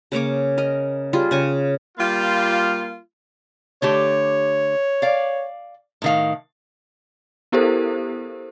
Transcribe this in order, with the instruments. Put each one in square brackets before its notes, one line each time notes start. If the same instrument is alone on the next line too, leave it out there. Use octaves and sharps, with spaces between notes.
[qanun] C#3 A#3 C#5 D6
A#4 D#5
G3 F4 G#4
C#3 G#5 C#6
[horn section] G3 A#3 F4
[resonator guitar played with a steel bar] D3 A3 G4 [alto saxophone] C#5
[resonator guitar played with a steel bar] D5 F5
A2 D#3 F5
[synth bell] B3 E4 G4 A4 A#4 C5